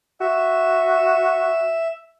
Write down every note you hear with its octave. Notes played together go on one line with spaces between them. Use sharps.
F#4 E5